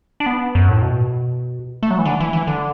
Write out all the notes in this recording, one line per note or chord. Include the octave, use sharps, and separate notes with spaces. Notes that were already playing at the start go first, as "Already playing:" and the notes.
D4
B3
F#2
A2
B2
A3
F#3
E3
D3
E3
E3
D3